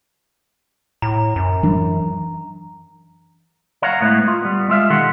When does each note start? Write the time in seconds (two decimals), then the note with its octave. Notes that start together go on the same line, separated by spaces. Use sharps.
1.02 A2 A#5
1.36 F#2
1.63 E3 F#3 D4
3.82 C#5 F5 F#5 A#5
4.01 A2 G#3 B3 E4
4.28 F4
4.42 G3 B3
4.68 G#3 F4 E5 F5
4.90 B1 D#3 G4 A4 F#5 C6